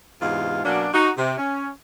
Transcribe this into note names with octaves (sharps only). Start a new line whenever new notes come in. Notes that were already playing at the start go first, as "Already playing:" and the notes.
E2 G#2 C3 G#3 F4 F5
B2 F#3 A#3 C#4 D4
D#4 F#4
C3
C#4